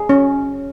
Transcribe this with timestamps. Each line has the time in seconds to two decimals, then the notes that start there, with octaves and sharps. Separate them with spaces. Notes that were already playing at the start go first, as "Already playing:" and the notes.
Already playing: G#4
0.09 C#4